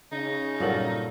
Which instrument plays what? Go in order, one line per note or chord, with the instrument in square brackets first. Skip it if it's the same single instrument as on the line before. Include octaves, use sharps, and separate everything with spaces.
[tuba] C#3 [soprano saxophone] D#4
[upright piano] G2 A#4 F#7 [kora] A#2 F#3 A4